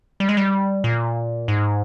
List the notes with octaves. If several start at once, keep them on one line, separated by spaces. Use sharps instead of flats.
G3
G#3
G3
A#2
G#2